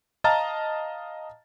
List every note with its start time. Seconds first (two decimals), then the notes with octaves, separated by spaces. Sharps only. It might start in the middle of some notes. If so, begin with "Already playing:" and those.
0.24 D#5 F5 A5 A#5 F6 A6